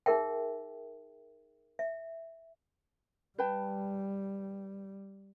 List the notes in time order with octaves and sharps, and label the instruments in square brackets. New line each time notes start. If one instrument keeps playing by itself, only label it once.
[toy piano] D#4 G#4 A#4 E5 G5
E5
[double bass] G3 [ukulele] B4 G5 A5